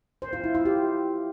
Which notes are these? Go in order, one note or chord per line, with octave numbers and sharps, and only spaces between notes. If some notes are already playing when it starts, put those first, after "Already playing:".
C5
F4
E4
F4
G4